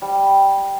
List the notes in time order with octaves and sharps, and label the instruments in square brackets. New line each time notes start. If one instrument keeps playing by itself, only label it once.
[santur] G3